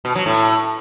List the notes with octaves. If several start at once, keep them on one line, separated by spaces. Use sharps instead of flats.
B2
F#3
A2